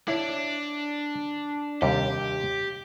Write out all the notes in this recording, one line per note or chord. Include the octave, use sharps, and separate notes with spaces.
D4 E4 C#5
D#2 C3 G3 G4